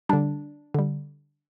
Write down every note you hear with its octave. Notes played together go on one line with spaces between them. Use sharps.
D3 G3 D4
D3 G3